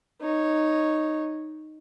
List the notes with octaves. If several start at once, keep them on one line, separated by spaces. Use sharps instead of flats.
D#4 C#5